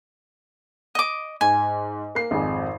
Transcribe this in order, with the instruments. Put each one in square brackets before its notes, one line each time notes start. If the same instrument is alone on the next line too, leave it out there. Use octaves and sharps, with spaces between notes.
[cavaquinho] D#5 D6
[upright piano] G#2 [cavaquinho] G#5
[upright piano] A#3 C7
G#1 F2 G#4